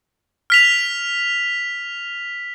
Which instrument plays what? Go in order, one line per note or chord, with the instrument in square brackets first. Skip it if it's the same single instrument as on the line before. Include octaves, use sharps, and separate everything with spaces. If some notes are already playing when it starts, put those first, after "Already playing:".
[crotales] F6 B6 F7